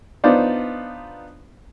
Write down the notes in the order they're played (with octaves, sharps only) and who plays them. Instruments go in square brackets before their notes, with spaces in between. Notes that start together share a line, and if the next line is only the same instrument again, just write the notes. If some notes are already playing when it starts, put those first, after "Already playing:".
[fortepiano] B3 D4 D#4 F4 C5 D5